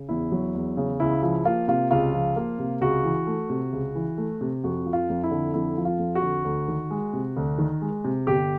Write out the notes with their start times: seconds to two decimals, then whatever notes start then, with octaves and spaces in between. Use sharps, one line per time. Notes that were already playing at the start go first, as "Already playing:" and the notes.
Already playing: C#3
0.09 E2 E4
0.32 F#3
0.55 E2
0.77 C#3
1.00 C#2 E4
1.23 F3 E4
1.45 A#3 F4
1.68 C3 F4
1.91 C#2 F4
2.14 F3
2.36 A#3
2.59 C3
2.81 C#2 F#4
3.04 E3
3.27 A3
3.50 C3
3.73 C#2
3.95 E3
4.18 A3
4.41 C3
4.64 F2 F#4
4.86 F3
4.93 F4
5.09 F2
5.24 E4
5.31 D3
5.54 F2 E4
5.78 F3
5.85 F4
5.99 F2
6.15 F#4
6.22 D3
6.45 D2
6.68 D#3
6.91 G#3
7.13 C3
7.37 D2
7.58 D#3
7.82 G#3
8.05 C3
8.27 G1 G4